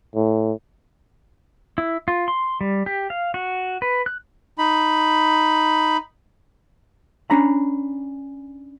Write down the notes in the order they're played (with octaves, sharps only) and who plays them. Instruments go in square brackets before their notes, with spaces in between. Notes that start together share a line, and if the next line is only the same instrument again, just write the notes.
[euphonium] A2
[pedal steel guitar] E4
F4
C6
G3
G4
F5
F#4
B4
F#6
[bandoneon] D#4 B5
[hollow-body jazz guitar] C#4 D4 A#5 B5